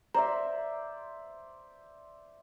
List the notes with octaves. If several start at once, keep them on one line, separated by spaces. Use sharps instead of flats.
C5 D5 E5 A#5